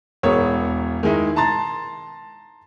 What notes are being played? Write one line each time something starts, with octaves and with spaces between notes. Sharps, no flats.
E1 B3 A#4 C#5
D#3 G#3 D#4 E4
A5 A#5 C6 A6